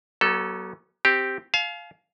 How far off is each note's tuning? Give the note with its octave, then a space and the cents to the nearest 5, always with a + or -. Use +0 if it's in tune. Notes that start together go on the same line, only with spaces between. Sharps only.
F#3 +30 B3 -45 A4 +0
C4 +0 G4 +0
F5 +0 G#5 +45